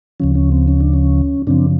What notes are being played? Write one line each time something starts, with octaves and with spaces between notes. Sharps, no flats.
D2 C#3 F3 C#4
C#4
C4
C#4
D4
C#4
F#2 C#3 F3 C4 D4